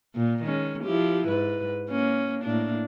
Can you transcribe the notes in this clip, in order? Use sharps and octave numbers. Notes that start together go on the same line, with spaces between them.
A#2
D#3 G#3 C#4
F3 E4 G4
G#2 B4
A#3 C#4
A2 A#3 D4